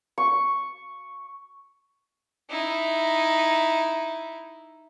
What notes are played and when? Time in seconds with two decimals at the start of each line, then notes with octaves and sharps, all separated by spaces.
0.18 C#6
2.50 D#4 E4